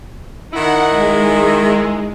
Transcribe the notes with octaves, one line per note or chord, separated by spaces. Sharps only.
D#3 D#4 E4 F#5
G#3